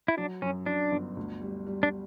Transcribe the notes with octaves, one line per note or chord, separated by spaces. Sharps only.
E4
F#3 D4
F#2 C#4
F#2 D4
G1
D2
G3
G3
D4